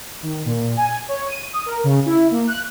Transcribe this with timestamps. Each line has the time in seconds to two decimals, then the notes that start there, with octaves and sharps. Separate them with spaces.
0.23 D#3
0.45 A#2
0.76 G#5
1.08 C#5
1.28 D#7
1.53 D#6
1.66 A#4
1.84 C#3
2.06 E4
2.31 A#3
2.47 F#6